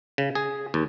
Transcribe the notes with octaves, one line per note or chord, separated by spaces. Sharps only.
C#3
G#4
D#2